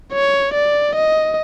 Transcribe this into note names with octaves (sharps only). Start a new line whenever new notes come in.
C#5
D5
D#5